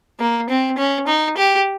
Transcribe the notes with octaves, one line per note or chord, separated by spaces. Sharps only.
A#3
C4
C#4
D#4
G4